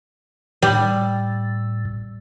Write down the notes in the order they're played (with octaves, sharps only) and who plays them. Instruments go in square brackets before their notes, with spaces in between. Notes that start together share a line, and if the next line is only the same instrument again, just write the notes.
[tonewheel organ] A2 [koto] G3